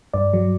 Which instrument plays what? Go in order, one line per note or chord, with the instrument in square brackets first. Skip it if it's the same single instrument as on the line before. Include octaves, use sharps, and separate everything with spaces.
[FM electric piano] G2 D5
F#3